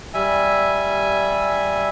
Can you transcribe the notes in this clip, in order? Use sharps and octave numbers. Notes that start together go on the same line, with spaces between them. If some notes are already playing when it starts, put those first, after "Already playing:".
G3 E5 G#5